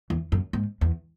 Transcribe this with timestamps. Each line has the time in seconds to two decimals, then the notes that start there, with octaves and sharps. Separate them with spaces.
0.10 E2
0.32 F#2
0.53 G#2
0.81 E2